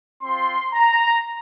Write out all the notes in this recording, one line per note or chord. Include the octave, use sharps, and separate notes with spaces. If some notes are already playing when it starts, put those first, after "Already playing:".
C4 F4 C6
A#5